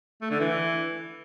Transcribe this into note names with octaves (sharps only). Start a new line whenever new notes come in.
A3
D3
E3